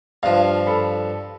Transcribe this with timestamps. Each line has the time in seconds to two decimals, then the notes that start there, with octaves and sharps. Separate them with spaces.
0.23 G2 F3 F5
0.67 A4 B5